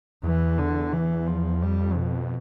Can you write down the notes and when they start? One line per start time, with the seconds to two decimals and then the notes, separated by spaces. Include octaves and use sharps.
0.23 E2 E3
0.58 D3
0.92 E3
1.27 F3
1.62 F2 G3
1.97 B2